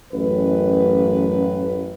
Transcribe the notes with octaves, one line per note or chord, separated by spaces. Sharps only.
A1 F#2 B4